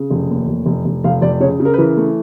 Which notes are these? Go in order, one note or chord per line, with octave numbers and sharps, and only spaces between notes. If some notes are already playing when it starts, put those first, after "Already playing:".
Already playing: C#3
F1
D#2
F1
F1
F1
F1 F5
F1 D5
C#3 C#5
C#3
A#4
B4
E3 A#4
A3